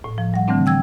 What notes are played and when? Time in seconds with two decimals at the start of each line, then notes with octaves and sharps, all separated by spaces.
0.04 A2
0.18 F3
0.34 G3 F#5
0.48 D3 E3 G3 A3 C4 D4
0.66 G5 E6 G#6